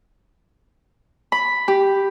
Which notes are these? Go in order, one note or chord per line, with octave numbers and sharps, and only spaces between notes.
B5
G4